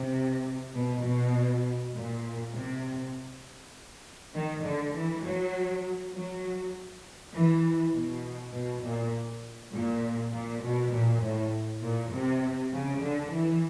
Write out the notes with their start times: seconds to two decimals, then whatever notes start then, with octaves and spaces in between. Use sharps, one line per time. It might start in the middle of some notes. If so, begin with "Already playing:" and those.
Already playing: C3
0.75 B2
1.04 B2
1.94 A#2
2.54 C3
4.34 D#3
4.64 D3
4.94 E3
5.24 F#3
6.14 F#3
7.33 E3
7.94 B2
8.53 B2
8.83 A#2
9.73 A#2
10.33 A#2
10.63 B2
10.93 A#2
11.23 A2
11.82 A#2
12.13 C3
12.73 C#3
13.02 D3
13.32 E3